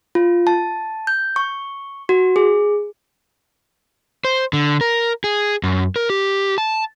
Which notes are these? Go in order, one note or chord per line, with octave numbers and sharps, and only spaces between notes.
F4
A5
G6
C#6
F#4
G#4
C5
D3
A#4
G#4
F#2
A#4
G4
A5